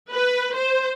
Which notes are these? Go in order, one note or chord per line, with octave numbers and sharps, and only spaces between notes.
B4
C5